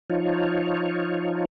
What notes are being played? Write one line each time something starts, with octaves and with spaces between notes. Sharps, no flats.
F3 D#4 F4 C#5